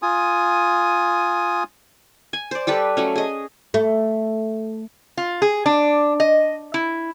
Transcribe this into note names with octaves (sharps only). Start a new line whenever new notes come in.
F4 G#5 D#6
G#5
C5 D5
G3 G4 A4 B4
F#3 A3 C#4
G#4 D#5
A3
F4
G#4
D4
D#5
E4